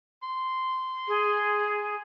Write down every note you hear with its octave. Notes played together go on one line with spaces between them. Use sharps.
C6
G#4